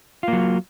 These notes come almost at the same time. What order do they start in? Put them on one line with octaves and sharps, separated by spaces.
F4 A#3 F#3